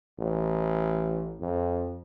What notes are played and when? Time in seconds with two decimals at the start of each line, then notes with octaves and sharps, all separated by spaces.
0.19 A1
1.41 F2